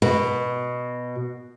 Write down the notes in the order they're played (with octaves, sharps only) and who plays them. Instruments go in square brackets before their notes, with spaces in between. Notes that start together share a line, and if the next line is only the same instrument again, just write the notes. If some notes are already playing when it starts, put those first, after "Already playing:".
[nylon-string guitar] B2